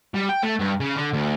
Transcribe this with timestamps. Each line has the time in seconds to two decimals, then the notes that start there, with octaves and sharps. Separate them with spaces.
0.14 G3
0.29 G5
0.43 A3
0.59 G2
0.80 C#3
0.96 D3
1.13 D2